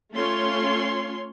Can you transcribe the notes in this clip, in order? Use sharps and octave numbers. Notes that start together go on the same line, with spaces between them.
A3 C#4 F4 C#5 C6